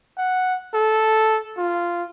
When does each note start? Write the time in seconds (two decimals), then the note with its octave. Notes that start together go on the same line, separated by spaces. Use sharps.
0.17 F#5
0.74 A4
1.58 F4